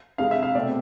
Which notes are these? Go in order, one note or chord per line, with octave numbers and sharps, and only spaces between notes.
F2 C3 G#3 F5
E5
F5
B2 A3 C4 D5